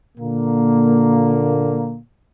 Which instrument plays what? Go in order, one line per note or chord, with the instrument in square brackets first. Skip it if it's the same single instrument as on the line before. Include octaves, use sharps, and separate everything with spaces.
[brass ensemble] A#2 D3 A#3